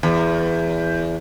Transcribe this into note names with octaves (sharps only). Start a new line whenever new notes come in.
E2